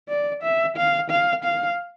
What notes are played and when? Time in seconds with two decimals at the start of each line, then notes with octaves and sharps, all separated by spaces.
0.09 D5
0.42 E5
0.76 F5
1.10 F5
1.44 F5